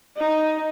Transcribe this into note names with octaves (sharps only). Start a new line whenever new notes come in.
D#4